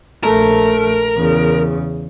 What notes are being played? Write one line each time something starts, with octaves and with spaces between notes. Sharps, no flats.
A#1 A3 A#4
E2 C#3